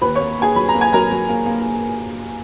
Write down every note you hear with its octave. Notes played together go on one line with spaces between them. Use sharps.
D#2 B4 B5
A#3 C#5 C#6
A#3 G#4 G#5
F#3 B5
A#5
A#3
G#5
F#3 A#4 A#5
F#3
A#3
A#3